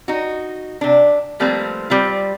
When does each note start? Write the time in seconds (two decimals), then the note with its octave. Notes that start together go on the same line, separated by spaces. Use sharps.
0.08 D#4 F#4
0.81 C3 D4
1.40 F3 G3 A3 A#3 C4 B4
1.90 G3 C4 F4